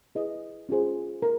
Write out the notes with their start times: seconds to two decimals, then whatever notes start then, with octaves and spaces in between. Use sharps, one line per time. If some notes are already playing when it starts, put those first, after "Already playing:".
0.15 E4 G#4 B4 D#5
0.69 C#4 F4 G#4 C5
1.22 A#4